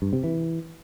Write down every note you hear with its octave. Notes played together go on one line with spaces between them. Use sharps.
G2
C3
E3